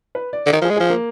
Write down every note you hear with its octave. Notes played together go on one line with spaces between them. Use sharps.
B4
D5
D3
D#3 A#4
F3
G#4
G#3
F3 G#4
A#3